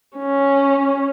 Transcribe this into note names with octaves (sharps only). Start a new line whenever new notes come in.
C#4